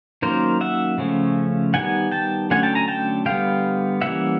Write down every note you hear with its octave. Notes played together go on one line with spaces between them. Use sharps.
D#3 F#3 A#3 C#4 A#4 C5
E5 F#5
C#3 F3 A3 C#4
D#3 G3 B3 F#5 G#5
G5 A5
D3 F#3 A3 C#4 F#5 G#5
G5 A5
G#5 A#5
G5 A5
D3 G3 B3 F5 G5
E3 G3 A#3 C#4 E5 F#5